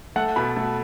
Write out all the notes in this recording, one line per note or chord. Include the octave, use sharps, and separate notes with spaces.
A3 F#5
B2 B5
A3